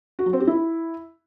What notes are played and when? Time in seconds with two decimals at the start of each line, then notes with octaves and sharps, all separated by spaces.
0.19 F#4
0.26 F#3
0.33 C4
0.40 G4
0.47 E4